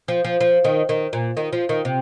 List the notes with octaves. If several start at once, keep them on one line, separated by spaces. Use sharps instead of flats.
F3
F3
F3
D#3
D#3
A#2
D#3
F3
D#3
C3